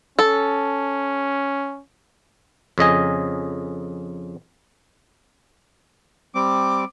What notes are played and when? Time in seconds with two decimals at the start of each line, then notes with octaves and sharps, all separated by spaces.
0.19 C#4 A4
2.78 F2 C#3 D#5 G#5
6.35 G3 C4 D6